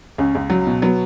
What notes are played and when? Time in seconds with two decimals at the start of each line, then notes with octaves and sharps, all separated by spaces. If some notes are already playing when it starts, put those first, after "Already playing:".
0.18 C#2 C#4
0.35 C#2
0.50 F#3
0.67 B2
0.82 F#3 B3